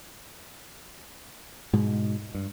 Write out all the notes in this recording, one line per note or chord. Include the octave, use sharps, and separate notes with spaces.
G#2 B2 G#3
G2